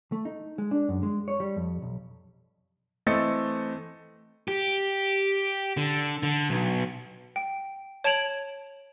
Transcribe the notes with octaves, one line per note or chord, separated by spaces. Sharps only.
A3
D#4
G#3
D4
F#2
G#3
C#5
G3
F2
B1
E3 A3 C4 D#5 A6 C#7
G4
D3
D3
B1
G5
C#5 A5 G#6 D7 F7 F#7